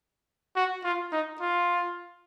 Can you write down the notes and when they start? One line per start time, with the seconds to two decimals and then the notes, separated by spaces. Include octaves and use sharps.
0.56 F#4
0.84 F4
1.13 D#4
1.41 F4